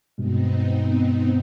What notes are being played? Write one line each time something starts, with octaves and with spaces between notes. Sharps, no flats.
G2 B2 G#3 B3 C4 D#4